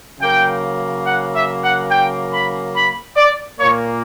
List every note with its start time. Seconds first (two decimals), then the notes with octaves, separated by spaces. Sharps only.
0.21 C#3 F#3 A#3 G5
1.06 F#5
1.34 E5
1.63 F#5
1.90 G5
2.32 B5
2.75 B5
3.16 D5
3.59 A#2 A#3 C#5